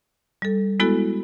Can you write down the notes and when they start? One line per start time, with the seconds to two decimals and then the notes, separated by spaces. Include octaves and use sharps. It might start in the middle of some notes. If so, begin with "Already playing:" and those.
0.42 G3 A4
0.80 G#3 B3 E4 F#4 A4